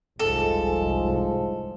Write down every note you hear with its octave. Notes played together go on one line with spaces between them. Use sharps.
F1 C2 G#2 F3 G#3 A4